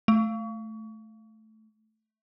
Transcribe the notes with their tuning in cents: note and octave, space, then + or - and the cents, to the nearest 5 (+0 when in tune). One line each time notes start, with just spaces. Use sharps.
A3 -10